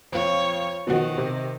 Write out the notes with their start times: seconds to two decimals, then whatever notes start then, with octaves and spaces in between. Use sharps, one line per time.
0.12 F2 F4 C#5
0.87 B2 D#3 F3 F#4
1.18 C3